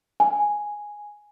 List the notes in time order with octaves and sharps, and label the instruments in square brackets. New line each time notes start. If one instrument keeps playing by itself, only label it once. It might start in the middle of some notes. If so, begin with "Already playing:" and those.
[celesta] G#5